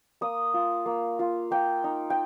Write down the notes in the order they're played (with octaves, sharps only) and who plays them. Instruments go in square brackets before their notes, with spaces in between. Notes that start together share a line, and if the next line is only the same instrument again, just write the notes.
[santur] A#3 D#6
F4
A#3
F4
A#3 G5
D#4
G5